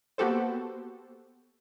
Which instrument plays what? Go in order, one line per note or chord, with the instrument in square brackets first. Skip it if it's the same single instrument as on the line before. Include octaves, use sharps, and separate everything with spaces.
[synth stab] A#3 B3 F#4 G4 A4 C5